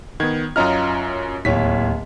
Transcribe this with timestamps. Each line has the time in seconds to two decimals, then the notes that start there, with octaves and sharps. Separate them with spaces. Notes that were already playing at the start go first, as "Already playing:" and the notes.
0.20 D#3 B3 G#6
0.56 F#2 C#4 F4 D#5 A#5 F6
1.45 D1 D#2 C#5 B6